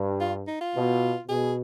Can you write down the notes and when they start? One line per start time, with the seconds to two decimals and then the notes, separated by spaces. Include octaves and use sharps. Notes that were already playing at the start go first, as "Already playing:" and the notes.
Already playing: G2
0.21 F4
0.47 D#4
0.61 F4
0.75 B2
1.28 B2 G#4